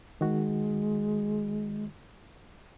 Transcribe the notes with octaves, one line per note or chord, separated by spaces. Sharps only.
D#3 G#3 F#4